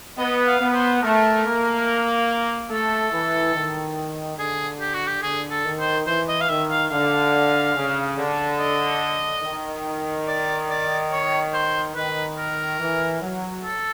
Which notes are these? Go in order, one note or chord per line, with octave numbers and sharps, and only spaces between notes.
B3 D#5
F5
B3
C5
A3 A#4
A#3
A3 A4
E3
D#3
D3 G#4
G4
F#4
G4
D3 G#4
A4
D#3
C5
E3 C5
D#5
F5
D#3 E5
F5
D3 F5
C#3
D3
D#5
D#3
D5
D5
C#5
C5
D#3 B4
A#4
E3
F#3
A4